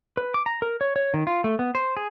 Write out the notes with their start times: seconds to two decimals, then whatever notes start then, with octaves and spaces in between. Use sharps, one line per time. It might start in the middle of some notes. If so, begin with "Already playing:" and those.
0.17 B4
0.34 D6
0.46 A#5
0.62 A#4
0.81 C#5
0.96 C#5
1.14 D#3
1.27 F4
1.44 A3
1.59 B3
1.75 C5
1.97 G#4